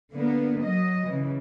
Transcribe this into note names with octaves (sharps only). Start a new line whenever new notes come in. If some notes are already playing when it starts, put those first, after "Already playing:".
D3 A#3 B3
F#3 D#5
C#3 E3